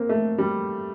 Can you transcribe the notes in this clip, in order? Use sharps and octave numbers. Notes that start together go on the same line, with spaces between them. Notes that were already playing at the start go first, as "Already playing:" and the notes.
Already playing: A#3 C4
A3
G3